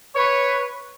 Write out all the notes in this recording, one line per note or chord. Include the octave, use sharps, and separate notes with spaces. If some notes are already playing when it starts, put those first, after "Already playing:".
B4 C#5